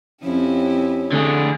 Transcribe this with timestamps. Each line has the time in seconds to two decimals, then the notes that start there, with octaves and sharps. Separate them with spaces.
0.24 F2 C#4 E4 G4
1.12 D3 A3 G#4